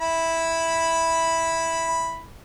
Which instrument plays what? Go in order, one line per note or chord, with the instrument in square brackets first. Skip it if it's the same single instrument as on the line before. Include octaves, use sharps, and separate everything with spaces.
[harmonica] E4 B5